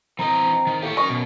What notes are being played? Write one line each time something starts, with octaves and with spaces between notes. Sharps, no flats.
E3 C4 D#5 A#5
D#3
A2 A#3 G4 C#5
F#2 A#4 D#5 C#6
B2